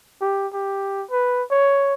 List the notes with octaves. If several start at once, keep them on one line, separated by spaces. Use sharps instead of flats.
G4
G4
B4
C#5